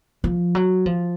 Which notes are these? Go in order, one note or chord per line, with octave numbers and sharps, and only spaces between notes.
F3
F#3
F3